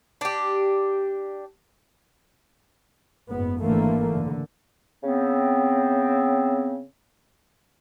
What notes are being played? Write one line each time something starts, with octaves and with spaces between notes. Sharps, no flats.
D4 G4
F#1 G#2 B3
G#1 G#2 D3 E3 A3 A#3
F#1 D3
C#3 B3 C4